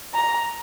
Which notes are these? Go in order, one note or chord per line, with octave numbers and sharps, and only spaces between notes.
A#5